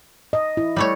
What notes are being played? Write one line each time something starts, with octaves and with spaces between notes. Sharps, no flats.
D#5
E4
G3 A3 C#5